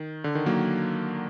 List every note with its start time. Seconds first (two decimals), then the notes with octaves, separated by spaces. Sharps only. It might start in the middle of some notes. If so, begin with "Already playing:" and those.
Already playing: D#3
0.24 D3
0.35 D#3
0.46 F#3 A#3